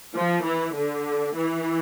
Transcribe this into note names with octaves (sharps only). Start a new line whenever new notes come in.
F3
E3
D3
E3